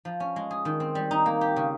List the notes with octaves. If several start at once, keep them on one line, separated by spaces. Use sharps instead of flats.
F3
C#4
G#3
G#4
D#3
C4
G3
D#4
A#3
G4
C#3